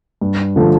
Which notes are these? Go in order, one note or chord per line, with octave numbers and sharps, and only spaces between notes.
G2
D3 F3 A3